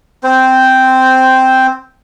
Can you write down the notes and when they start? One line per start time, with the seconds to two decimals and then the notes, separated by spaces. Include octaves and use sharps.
0.24 C4 C5